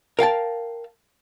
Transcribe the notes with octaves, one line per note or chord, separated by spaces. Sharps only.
A#4 F5 G5 A5